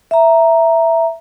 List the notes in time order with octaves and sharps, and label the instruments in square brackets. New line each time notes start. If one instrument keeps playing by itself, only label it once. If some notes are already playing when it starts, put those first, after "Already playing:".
[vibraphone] E5 A#5